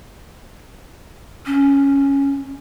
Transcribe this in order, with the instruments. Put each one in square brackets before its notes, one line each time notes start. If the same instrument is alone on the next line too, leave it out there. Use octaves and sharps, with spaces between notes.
[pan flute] C#4